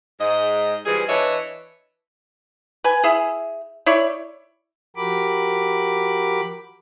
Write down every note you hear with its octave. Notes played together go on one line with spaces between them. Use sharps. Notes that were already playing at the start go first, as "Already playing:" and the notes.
G#2 D#5
E3 F3 G3 G#4
E3 D4 B4 C#5 D#5 E5
B4 G#5
E4 G#4
E4 C#5 D5
F3 F#4 G4 A#4 B5 D6